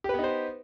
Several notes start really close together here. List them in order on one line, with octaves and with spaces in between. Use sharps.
G4 B4 B3 D#4 C5